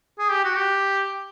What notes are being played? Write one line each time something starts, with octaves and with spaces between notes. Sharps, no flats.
G#4
G4
F#4
G4